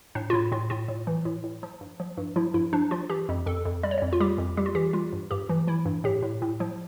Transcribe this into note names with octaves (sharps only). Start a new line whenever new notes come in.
A2 D4
F4
A2 E4
A2 F4
A2 F4
A2
E3
A2
A2
F3
G2
F3
G2
F3 E4
G2 E4
F3 D4
F3 F4
E3 G4
F2
F2 A4
F2
G3 D5
C#5
D5
F2
F4
G3 G4
F2
G3 G4
F4
E3 G4
G3 F4
G2
G2 G4
E3
E3 E4
G2
A2 G4
A2
A2
F3